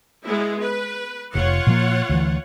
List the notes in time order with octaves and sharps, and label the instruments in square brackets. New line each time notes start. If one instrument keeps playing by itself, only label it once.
[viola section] G#3 B3 E4
B4
[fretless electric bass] F1 [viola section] F4 C#5 F#5
[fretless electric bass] A#2 F3 A#3
D2 E3